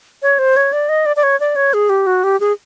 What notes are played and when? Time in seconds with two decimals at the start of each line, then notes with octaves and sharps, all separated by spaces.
0.22 C#5
0.39 C5
0.56 C#5
0.73 D5
0.89 D#5
1.06 D5
1.16 D5
1.23 C#5
1.40 D5
1.56 C#5
1.74 G#4
1.89 G4
2.07 F#4
2.24 G4
2.40 G#4